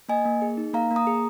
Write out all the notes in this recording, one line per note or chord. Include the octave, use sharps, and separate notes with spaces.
A#3 D#5 G#5
A#3
G#4
D#4
A#3 F5 A#5
A#3
A#5 D#6
G#4